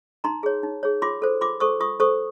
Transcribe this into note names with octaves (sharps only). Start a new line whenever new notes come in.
D#4 A#5 C6
G#4 C#5
D#4
G#4 C#5
F4 C6 D6
A4 C5
F4 C6 D6
A4 C5 C#6 D#6
F4 C#6 D#6
A4 C5 C#6 D#6